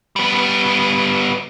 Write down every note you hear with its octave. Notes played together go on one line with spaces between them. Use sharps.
G3 B3